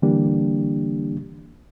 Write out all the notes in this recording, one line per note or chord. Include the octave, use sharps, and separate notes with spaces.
D3 E3 G3 A#3 D4 G4